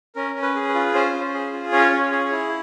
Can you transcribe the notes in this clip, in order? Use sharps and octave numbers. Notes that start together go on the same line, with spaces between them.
C#4 A#4
C#4
B4
G#4
B4
F4
C#4 C5
C#4
G#4
F4
C#4 C#5
C#4
G#4
E4